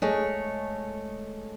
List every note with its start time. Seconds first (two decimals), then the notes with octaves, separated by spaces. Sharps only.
0.02 G#3 A3 C#5